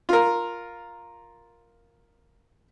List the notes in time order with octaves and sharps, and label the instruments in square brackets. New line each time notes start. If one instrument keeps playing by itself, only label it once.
[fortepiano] F4 A#4